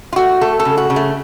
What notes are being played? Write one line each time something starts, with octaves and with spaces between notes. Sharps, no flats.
F4
A3 F#4
A3 A4
A4
C#3
F#4
C#3
A3